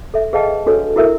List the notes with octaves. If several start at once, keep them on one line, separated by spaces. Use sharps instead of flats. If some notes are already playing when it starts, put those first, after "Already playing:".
A4 E5
G#4 B4 D#5 F5 G5 A5
D4 F#4 A4 B4 C#5
E4 F#4 A4 A#4 E5